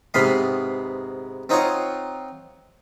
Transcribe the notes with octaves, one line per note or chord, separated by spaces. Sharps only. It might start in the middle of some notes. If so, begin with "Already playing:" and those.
G#2 C3 B3 F5 B5 C6
C4 D#4 F4 C#5 F#5